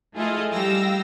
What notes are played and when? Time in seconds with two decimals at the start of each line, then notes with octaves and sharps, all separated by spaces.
0.14 A3 E4 F4 G#4 A4 D#5
0.50 G3 F5 G5 E6 A#6